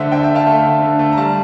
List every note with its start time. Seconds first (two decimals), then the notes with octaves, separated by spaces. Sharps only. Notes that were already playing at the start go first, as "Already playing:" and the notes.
Already playing: D3 A3 C5 E5
0.12 D3 E5 G5
0.23 E5 G5
0.30 A3
0.35 F5 A5
0.47 A3
0.65 D3
0.82 D3
0.99 A3
1.12 A#5
1.17 G3 F5 A5